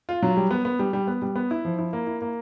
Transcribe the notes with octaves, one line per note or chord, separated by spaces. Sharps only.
F4
F#3
G3
B3
B3
G3
G3
B3
G3
B3
E4
F3
E4
A#3
E4
A#3